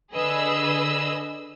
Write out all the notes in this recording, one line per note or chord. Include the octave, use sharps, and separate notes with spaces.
D3 G#4 B4 D#5 E6